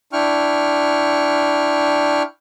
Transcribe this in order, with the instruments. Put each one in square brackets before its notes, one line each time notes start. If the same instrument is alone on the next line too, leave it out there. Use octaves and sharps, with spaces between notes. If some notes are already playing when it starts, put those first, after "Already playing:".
[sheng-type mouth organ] D4 E4 G5 C#6 F6